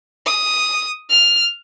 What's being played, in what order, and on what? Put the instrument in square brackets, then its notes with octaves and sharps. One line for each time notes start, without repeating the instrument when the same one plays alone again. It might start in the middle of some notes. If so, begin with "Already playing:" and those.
[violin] D#6
F6